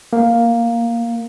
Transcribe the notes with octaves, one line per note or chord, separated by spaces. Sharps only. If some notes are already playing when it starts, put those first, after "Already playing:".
A#3